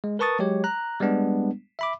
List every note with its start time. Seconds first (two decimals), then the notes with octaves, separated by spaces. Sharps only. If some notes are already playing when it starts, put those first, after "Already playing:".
0.04 G#3
0.19 A#4 B4 A5 C#6 D#6 A6
0.39 F#3 G#3 G4 C#5
0.64 A#5 F#6
1.00 G3 G#3 B3 D4
1.79 E5 B5 D6